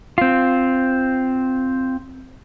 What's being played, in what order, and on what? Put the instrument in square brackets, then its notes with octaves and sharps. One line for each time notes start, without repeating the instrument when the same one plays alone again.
[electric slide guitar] C4 F4